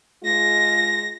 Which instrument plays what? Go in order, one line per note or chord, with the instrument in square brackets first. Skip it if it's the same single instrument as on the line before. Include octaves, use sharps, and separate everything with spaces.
[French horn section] G#3 F4 [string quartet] A#6